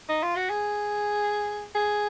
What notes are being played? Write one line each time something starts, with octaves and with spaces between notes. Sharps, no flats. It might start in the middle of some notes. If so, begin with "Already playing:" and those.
D#4
F4
F#4
G#4
G#4